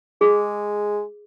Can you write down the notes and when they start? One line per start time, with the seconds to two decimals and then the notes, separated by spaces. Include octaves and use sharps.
0.21 G#3 G#4